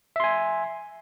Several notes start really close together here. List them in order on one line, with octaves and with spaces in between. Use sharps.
E5 C6 G#5